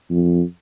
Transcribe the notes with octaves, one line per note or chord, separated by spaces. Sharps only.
F2